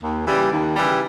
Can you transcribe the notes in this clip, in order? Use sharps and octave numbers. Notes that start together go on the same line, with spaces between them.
D#2
C#3 E3 G3
D#2
C#3 E3 G3